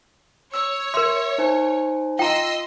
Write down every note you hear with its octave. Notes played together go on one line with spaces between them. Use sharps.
C#5 E6
A#4 E5 C6
D#4 C5 G#5
F4 D#5 G5 A#5 C6 E6